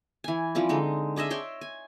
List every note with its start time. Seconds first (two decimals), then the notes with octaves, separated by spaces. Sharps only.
0.24 E3 G#5
0.55 E3 F3 G3 C4
0.69 D3 G#3 D#4
1.16 D4 G#4 D#5 E5
1.30 C#5 G5 C6
1.61 G#5